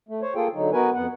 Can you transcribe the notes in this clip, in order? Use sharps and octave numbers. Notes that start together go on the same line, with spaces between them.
A3
C5 C#5
A#3 F4 G#4 A4 G5
D3 F#3 D#4
B3 F#4 A#4 B4 G#5
F2 B3 F#5